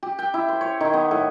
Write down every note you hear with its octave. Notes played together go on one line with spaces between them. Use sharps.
G4
G5
E4
C5
C#5
D#3
B3
A2